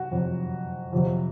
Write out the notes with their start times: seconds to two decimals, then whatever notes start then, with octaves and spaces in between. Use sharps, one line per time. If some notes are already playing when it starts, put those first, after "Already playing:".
Already playing: C3 F#3 F#4
0.11 F2 C3 F#3
0.93 F2 C3 F#3